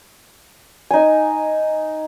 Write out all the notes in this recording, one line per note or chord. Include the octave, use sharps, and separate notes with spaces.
D#4 G#5